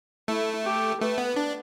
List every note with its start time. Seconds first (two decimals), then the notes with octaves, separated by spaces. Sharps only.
0.28 A3 E4
0.65 G4
1.01 A3 B4
1.18 B3
1.36 D4